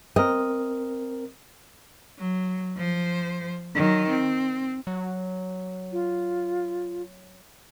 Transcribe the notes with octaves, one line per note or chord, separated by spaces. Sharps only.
C4 A#4 D#5
F#3
F3 C5
D#3 F#3
C4
F#3
F4